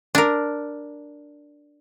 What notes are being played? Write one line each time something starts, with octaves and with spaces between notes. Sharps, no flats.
D4 A#4